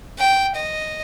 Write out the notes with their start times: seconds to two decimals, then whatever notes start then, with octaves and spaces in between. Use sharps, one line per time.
0.18 G5
0.55 D#5